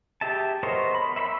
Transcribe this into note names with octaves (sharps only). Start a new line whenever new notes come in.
G4 G#4 E5 A5
B3 A#4 C5 C#5 D#5
B5
E5 B5 C6 E6